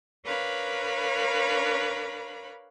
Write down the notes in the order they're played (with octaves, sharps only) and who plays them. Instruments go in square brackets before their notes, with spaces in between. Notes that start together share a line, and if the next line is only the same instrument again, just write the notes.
[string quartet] D4 A#4 B4 C#5 F5 B5